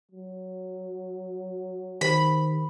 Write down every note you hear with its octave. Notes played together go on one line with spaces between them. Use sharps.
F#3
D#3 G4 C5 B5